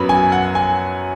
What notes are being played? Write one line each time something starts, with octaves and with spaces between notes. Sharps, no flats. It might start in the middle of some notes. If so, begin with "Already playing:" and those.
Already playing: F#2 F#3 B3 B5
G#5
F#5
G#5